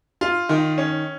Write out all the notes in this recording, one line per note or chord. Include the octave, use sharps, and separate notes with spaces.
F4
D#3
C#4